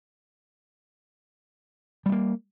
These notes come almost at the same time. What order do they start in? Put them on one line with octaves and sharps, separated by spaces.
G3 A3 A#3